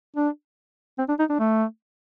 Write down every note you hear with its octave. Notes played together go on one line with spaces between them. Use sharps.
D4
C4
D4
D#4
D4
A3